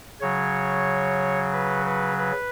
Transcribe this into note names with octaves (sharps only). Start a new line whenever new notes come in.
C#3 F#3 C#5
B4
B4
B4